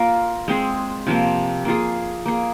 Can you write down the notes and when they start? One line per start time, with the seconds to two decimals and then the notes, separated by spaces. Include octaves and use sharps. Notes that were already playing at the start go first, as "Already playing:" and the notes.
Already playing: A#3 F4 A#4
0.48 G#3 C4 G#4
1.07 C3 F3 A#3
1.65 A#3 F4 G#4
2.25 A#3 G#4